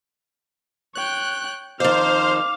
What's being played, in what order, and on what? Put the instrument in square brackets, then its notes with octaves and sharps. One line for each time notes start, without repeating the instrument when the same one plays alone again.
[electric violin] C#5 G5 [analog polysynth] F#6
[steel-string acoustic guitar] F2 D#3 [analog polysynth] C5 [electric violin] F5 F6 [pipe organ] D6